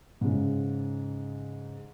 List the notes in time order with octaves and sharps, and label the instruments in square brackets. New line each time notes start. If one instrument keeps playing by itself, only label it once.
[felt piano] G#2 C#3